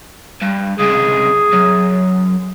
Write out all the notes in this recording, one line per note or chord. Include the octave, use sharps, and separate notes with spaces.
G2
C#2 C3 G#4
F#2